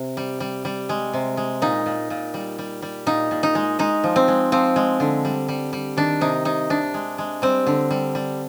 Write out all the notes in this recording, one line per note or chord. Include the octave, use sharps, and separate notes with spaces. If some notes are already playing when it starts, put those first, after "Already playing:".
Already playing: C3
G3
G3
G3
G#3
C3
G#3
A#2 D#4
A#2
A#2
G3
G3
G3
A#2 D#4
A#2
D#4
G#3
G#3 D#4
F3
C4
G#3
F3 C4
G#3
D3
G3
G3
G3
D#3 D4
C3 D#4
C3 D#4
C3 D4
G#3
G#3
G3 C4
D3
G3
G3